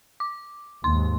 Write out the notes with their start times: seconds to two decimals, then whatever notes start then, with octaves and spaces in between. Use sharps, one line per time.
0.20 D6
0.84 D#2 G#2 C6